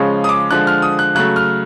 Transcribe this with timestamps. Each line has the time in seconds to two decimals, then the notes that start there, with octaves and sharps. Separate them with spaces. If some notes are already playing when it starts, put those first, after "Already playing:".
Already playing: C#3 F3 G#3 C#4
0.24 D#6
0.29 D6
0.51 D3 F3 G#3 F#6
0.67 F6
0.82 D#6
0.99 F#6
1.15 C#3 F#3 A3 F#6
1.36 F6